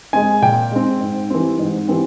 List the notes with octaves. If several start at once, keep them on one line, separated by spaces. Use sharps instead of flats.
G#3 C4 G#5
A#2 G5
G#3 C4
G#2
E3 G3 C4
G#2
E3 G3 C4